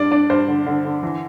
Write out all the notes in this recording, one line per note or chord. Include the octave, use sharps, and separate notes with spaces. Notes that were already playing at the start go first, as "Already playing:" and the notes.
Already playing: G2 D4 D5
D4 D5
G2 C5
D3
D3
D3
E3